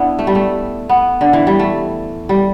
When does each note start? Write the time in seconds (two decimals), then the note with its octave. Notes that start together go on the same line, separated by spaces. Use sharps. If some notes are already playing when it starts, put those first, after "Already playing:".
Already playing: B3 D4 E4
0.19 A3
0.27 G3
0.35 A3
0.89 B3
1.21 D3
1.33 E3
1.47 G3
1.59 A3
2.29 G3